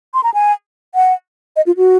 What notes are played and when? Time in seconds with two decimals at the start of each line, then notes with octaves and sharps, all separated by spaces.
0.14 C6
0.24 A#5
0.34 G#5
0.95 F#5
1.56 D#5
1.66 F4
1.77 F#4